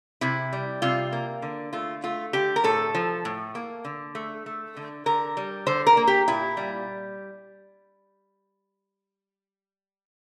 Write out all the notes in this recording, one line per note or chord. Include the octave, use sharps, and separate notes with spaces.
C3 E4
G3
C3 F4
A#3
D3
A3 F4
A3 F4
D3 G4
A#4
A2 A4
F3
A2
A#3
D3
A3
A3
D3
D3 A#4
G3
D3 C5
A#4
A#3
G4
A#2 E4
G3